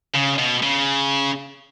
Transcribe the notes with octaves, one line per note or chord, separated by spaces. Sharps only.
C#3
B2
C#3